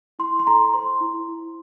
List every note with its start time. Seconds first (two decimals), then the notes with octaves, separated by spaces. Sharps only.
0.19 E4 C6
0.39 C6
0.47 A4 A#5
0.73 C5 C6
1.01 E4
1.28 E4